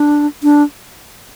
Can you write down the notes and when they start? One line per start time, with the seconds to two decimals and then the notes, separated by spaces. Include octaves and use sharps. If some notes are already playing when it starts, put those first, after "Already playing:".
Already playing: D4
0.43 D4